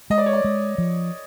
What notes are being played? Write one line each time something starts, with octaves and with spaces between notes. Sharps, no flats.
G#3 D#5
D5
C#5
D5
G#3
F3